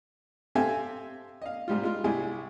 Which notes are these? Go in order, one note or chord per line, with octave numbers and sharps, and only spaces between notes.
C4 G4 A4 E5 F5 G#5
D#5 F5
G#2 G3 F4
G#3 F4
C2 E4 G4 G#4 G#5